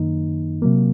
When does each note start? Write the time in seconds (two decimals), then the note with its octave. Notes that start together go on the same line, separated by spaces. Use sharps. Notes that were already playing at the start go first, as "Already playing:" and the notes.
Already playing: F#2 D#3 A#3 D#4
0.62 C3 F#3 A#3